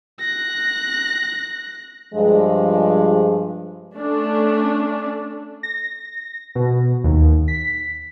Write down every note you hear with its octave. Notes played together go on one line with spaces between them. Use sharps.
F#6 A#6
G2 F3 G#3
A3 C#4 D4
A#6
B2
D#2
B6